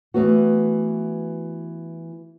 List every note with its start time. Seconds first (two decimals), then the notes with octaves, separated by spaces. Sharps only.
0.14 E3 A3 B3 F#4